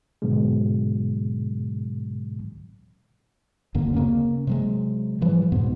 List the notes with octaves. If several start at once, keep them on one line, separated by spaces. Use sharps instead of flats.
G#2 B2 D3 F#3 G#3
D1 F#2 D3 A#3
C#3 A#3 C4 C#4
C3 F#3 G#3
G#2 E3 F3 G3
F2 G#2 B2 B3